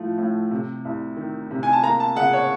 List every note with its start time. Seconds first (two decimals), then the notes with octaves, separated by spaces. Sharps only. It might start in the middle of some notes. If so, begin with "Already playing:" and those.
Already playing: A2 F3 A3
0.18 A2
0.51 C3
0.85 C2
1.17 D#3
1.51 C3
1.63 G#5
1.73 A5
1.83 A#3 A#5
2.00 A5
2.16 C#3 F#5
2.33 C#5